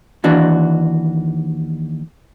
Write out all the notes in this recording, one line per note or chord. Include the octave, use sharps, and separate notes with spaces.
D#2 E3 D4 F#4